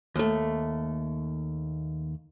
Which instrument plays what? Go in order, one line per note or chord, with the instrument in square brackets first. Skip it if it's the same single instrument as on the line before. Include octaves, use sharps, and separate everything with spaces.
[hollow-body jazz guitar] D#2 A3